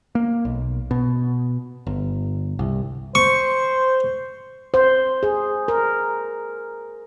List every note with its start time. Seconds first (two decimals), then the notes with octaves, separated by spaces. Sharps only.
0.15 A#3
0.45 B1
0.91 B2
1.87 G1
2.59 C2
3.15 C5 C#6
4.74 C5
5.23 G#4
5.68 A#4